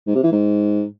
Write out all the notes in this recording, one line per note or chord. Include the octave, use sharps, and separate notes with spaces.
G#2
C3
E3
G#2